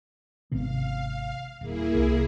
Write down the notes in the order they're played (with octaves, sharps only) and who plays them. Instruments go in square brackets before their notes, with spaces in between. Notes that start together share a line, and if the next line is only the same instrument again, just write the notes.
[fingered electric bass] G#1 C3 B3 [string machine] F5
[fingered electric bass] D#1 [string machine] A#3 E4 G#4
[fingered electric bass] C2